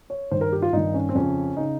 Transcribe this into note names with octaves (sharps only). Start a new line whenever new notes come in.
C#5
G2 D#3 C5
A#4
G4
F4
G2 D#3 D#4
C#4
C4
F2 C#3 C#4
C#3 D#4